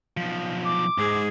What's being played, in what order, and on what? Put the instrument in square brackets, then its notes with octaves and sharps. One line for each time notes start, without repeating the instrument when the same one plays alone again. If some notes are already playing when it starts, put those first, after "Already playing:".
[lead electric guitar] B1 F3
[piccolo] D6
[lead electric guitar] G#2 [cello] G#4